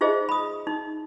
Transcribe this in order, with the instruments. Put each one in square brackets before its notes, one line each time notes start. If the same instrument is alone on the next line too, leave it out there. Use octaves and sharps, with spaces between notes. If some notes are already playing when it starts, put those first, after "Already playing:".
[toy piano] D#4 F4 G#4 C5 D#5 E5
B5 D#6
D#4